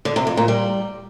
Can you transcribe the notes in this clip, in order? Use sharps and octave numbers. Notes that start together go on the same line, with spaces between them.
D3
C3
F2
A#2
G3